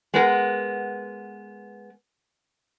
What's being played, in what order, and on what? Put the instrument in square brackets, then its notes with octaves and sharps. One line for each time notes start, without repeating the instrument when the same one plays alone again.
[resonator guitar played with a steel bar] G#3 B3 A#4